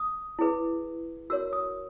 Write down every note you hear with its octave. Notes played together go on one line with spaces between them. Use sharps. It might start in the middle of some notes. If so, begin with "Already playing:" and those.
Already playing: D#6
E4 G#4 B4
F#4 A#4 C#5 E6
D#6